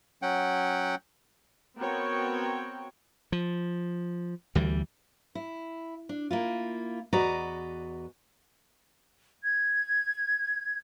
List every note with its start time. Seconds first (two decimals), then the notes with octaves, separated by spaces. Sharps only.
0.22 F#3 C#4 F#5 G5
1.78 B3 C4 F#4 A#4 C#5 G5
3.32 F3
4.55 D2 E3 G3
5.35 E4
6.09 D4
6.31 A#3 E4 F4
7.13 E2 F#4 B4 D5 D#5 A#5
9.42 G#6